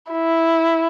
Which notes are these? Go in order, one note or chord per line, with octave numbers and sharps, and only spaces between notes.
E4